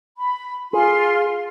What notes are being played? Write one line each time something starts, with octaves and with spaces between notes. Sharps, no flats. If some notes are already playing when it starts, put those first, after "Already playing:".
B5
F4 G#4 C6